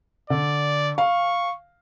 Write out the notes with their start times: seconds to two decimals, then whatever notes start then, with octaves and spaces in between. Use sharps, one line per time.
0.30 D3 D5
0.98 F5 C#6